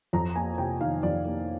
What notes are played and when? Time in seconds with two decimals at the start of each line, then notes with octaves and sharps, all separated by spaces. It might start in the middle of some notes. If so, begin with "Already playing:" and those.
0.13 F2 A#5
0.36 A#3 G#5
0.58 C3 G5
0.80 D#3 F5
1.03 F2 D5
1.25 A#3